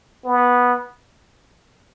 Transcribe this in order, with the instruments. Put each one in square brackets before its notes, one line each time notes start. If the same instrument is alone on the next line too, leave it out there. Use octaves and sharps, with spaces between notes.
[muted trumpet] B3